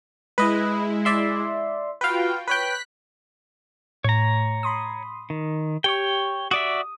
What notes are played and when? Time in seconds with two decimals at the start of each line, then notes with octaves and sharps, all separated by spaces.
0.38 G#3 E4 B4 D#5
1.05 D5 E5 C6
2.01 F4 F#4 B4 F5 G5
2.48 B4 C#5 G5 F#6 B6
4.04 A2 C#5 A#5
4.63 B5 C6 D#6
5.30 D#3
5.84 G4 C#5 G5 C#6
6.51 F#4 D5 E5 D#6